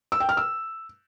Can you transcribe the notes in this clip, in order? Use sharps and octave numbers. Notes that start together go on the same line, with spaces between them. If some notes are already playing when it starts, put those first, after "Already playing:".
E6
G5
F6
E6